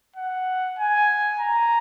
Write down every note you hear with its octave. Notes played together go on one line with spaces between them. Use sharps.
F#5
G#5
A#5